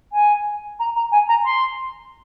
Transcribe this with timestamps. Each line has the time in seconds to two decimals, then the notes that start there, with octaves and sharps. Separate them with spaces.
0.13 G#5
0.79 A#5
0.96 A#5
1.12 G#5
1.28 A#5
1.45 C6